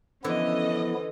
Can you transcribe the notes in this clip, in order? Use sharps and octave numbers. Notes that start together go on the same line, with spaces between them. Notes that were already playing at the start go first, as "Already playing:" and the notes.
D3 E3 F3 B3 C#4 E4 A4 D#5